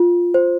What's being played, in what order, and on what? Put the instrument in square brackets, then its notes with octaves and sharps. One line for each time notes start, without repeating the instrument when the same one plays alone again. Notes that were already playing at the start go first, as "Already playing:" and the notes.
Already playing: [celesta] F4
C5